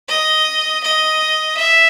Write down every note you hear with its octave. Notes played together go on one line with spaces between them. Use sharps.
D#5
D#5
E5